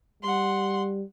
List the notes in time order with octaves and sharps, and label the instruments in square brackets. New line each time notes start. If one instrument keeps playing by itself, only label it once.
[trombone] G3 [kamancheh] F#5 C6